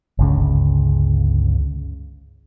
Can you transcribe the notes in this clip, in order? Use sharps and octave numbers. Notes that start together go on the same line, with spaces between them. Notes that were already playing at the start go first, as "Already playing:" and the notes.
G1 C#2 C#3